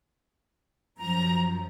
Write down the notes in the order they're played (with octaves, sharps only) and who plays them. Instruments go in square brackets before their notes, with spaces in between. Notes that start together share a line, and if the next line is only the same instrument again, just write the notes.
[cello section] F#2 F3 [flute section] A#5